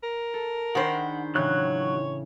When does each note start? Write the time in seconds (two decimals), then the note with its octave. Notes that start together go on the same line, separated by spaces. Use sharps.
0.03 A#4
0.34 A4
0.75 D#3 D4 G#4 C5 F#5 B5
1.35 A2 C#3 E3 F#3 C#5 F#6